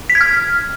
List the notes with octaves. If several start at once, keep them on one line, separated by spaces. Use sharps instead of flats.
B6
G#6
F6